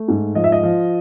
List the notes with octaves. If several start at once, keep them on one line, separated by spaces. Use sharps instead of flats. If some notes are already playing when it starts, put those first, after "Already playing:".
Already playing: A3
G#2
F3 D#5
E5
D#5
F3